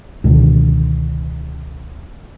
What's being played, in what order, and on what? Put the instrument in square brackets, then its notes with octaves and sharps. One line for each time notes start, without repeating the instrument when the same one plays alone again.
[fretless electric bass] C#2 B2 D3 D#3